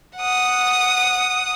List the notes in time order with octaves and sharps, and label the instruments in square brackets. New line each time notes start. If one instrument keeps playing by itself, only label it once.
[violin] F#5 D#6